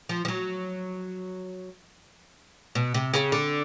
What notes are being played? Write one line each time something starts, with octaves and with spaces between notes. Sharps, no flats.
F3
F3
F#3
B2
C3
C#3
D3